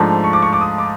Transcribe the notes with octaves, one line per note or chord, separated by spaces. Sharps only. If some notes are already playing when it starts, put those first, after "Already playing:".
Already playing: G#2 F3 A3 D4
C#6
D6
C#6
D6
D#6
D6